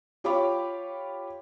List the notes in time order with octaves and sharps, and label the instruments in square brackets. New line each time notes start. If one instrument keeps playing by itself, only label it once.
[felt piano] F4 G4 C#5 F5 B5 D6